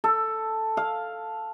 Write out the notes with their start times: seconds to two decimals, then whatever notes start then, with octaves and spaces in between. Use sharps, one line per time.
0.04 A4
0.77 F5